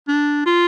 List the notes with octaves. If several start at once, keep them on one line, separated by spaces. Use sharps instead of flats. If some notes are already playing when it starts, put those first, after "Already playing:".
D4
F4